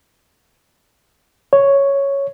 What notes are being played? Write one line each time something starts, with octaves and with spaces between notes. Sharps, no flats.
C#5